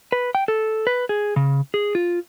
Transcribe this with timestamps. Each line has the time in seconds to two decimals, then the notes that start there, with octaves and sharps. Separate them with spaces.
0.12 B4
0.35 G5
0.48 A4
0.87 B4
1.09 G#4
1.36 C#3
1.74 G#4
1.95 F4